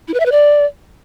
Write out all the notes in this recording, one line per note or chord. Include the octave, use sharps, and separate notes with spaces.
E4
B4
E5
B4
D5